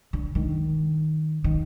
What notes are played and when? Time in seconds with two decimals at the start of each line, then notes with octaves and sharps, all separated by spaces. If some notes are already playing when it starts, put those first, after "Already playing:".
0.13 D3
0.35 D#3
1.44 D#3